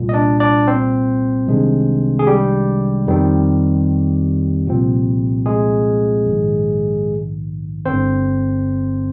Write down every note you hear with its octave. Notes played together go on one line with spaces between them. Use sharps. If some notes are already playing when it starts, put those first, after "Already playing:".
Already playing: C2 A#2 G3
D#5
D4 D5
D4 D5
C4 C5
C2 C3 D#3 G#3 D4
G#4
G3 G4
F2 D#3 G3 C4
C2 A#2 F3 C4
G#3 G#4
A#1 G#2 D#3
G1 G2 D3 C4 C5